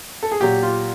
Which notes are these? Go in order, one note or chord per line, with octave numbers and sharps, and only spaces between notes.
A4
G#4
A#2 F#3 G4
F4